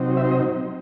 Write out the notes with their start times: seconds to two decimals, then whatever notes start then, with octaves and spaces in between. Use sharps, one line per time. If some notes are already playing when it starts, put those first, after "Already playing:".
Already playing: C3 F#3 C4 D#4
0.17 E5
0.24 C5
0.31 D#5